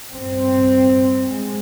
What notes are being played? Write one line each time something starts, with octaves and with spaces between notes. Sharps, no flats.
G2 C4
G#3